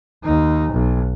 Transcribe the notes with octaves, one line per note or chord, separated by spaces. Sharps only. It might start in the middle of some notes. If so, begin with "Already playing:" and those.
D#2 D#4
B1